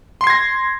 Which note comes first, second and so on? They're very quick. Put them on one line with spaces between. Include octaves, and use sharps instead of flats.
C6 C7 G#6 A#6